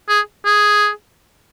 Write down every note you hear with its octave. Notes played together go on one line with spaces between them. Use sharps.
G#4
G#4